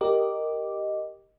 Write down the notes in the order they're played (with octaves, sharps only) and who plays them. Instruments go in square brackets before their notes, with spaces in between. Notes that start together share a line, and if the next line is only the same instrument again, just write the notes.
[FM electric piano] G4 A#4 D#5 D6